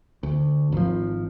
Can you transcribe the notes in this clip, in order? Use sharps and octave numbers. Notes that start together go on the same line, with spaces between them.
D2
G#1 F3